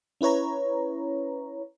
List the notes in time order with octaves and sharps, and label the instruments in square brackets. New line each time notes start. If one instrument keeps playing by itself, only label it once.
[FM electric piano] C#4 E4 B4 C#5 A#5